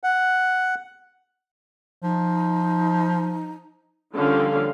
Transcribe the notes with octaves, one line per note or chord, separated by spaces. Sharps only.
F#5
F3 D#4
D3 F3 G3 A#3 C#4 F5